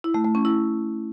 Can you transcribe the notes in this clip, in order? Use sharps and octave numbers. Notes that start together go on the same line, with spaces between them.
E4
A3
A3
C#4
E4